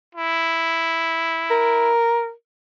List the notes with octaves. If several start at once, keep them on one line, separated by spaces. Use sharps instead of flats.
E4
A#4